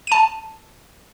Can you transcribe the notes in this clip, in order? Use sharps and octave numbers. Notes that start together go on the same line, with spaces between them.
A5 D#7